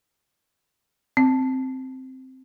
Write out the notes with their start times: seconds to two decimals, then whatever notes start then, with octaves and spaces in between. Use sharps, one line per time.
1.17 C4